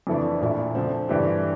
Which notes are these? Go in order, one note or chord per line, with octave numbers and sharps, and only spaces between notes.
F2 E3 A3 D4
A#2 A3 E4
D3 F3 A3 C4
G2 E3 A3 D4 G4